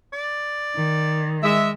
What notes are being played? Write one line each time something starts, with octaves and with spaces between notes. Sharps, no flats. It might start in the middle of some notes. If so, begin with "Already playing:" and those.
D5
D#3
G#3 E5